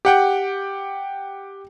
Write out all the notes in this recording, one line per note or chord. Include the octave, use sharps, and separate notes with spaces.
G4 F#5 G5